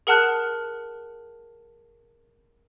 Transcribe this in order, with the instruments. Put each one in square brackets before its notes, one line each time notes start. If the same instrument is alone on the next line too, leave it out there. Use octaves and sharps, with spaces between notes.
[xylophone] G#4 A#4 F#5 A5 F6 F#6